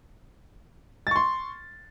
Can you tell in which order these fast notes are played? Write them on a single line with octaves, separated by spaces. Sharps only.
A6 C#6 C6